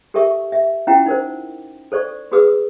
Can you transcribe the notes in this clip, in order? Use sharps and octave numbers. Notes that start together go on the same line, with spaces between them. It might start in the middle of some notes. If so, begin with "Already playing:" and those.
G4 A4 A#4 E5 C#6
E5
C#4 E4 F4 F#5 G5 A#5
D#4 A#4 C5
A4 C5 D5 C#6
F#4 G#4 B4 D#6 E6